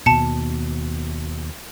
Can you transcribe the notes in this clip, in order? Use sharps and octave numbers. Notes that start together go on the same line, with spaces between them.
D#2 B2 A5 C#7